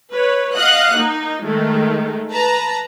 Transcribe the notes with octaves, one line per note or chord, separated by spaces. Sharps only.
B4 C#5
D#5 F5 F#5 D#6 F#6
A#3 D#4
D#3 G#3 A3
B4 A5 A#5